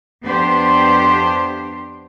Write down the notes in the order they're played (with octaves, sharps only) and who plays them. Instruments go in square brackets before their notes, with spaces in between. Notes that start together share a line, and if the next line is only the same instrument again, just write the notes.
[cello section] F2 B3 D4 G4 C5